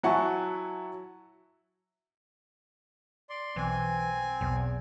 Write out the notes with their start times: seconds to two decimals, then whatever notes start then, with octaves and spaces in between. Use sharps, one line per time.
0.03 F#3 E4 F#5 G#5 A5 C#6
3.30 D5 C6
3.56 B1 E3 C4 G#5
4.41 B1 E2